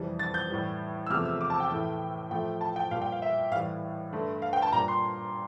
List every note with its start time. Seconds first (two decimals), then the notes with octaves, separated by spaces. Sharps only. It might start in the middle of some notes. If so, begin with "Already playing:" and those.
Already playing: F2 C3 E3 G3
0.19 A6
0.34 G6
0.50 A2 E3 G3
1.07 E6
1.10 E2 C3 F3 A3 F6
1.25 E6
1.41 D6
1.50 A5
1.60 G5
1.70 A2 E3 A3
2.31 A2 F3 A3 G5
2.61 A5
2.76 G5
2.91 A#2 G3 F5
3.02 G5
3.12 F5
3.22 E5
3.52 A2 E3 G3 F5
4.13 G2 D3 A3
4.42 F5
4.53 G5
4.62 A5
4.72 A#2 G3 A#5
4.88 C6